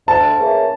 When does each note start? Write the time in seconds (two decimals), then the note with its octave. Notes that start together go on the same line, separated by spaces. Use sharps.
0.07 D2 A5
0.38 C#3 E3 A#3